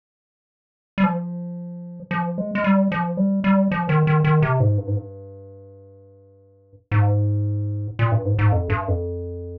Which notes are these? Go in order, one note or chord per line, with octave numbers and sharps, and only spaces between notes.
G3
F3
F3
G#3
G#3
G3
F3
G3
G3
F3
D#3
D#3
D#3
C3
G#2
G2
G#2
G2
G#2
A#2
G2
G#2
G#2
F2
G2
F2